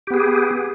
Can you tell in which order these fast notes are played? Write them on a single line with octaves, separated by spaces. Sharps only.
G4 B3 G#4